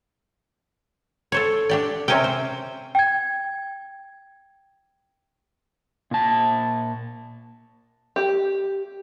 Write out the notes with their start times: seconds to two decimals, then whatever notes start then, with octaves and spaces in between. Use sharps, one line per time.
1.32 A4 C5 C#5
1.69 D4 G4 D5
2.08 C3 C4 C#4 A#4 G5
2.24 C5
2.95 G5 G#6
6.11 A#2 A5
8.16 G4